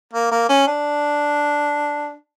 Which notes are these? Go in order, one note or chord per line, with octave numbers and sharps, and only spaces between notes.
A#3
A#3
C#4
D4